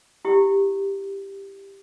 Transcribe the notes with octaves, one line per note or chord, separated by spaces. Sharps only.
E4 G4